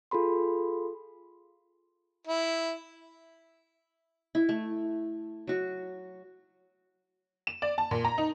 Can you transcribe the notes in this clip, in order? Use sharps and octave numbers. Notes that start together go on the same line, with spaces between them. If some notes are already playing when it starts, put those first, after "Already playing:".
F4 G#4 A4 B5 C6
E4
E4
A3
F#3 F#4
E7
D5
A5
A#2
A#5
D#4